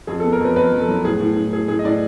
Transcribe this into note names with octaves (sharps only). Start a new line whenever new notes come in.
F2 G#4
A4
B3
A#4
F2 B4
F2 B4
F2
A4
F#3
A2 G#4
A2
A2
A2 G#4
A2 G#4
D#5
A2 D5